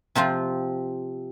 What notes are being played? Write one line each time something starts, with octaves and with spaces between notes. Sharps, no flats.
C3 F3 C4 F4